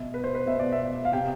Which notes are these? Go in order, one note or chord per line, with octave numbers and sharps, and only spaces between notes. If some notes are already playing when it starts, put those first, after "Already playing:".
Already playing: B2 E5
B4
C5
B4
B2 E5
D5
E5
F5
C3 G5